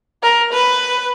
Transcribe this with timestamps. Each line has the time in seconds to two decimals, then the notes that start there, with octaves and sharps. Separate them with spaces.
0.23 A#4
0.53 B4